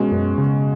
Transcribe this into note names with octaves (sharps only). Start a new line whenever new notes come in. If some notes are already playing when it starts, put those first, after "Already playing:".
Already playing: B2 G#3 C#4 F#4
F#2
C#3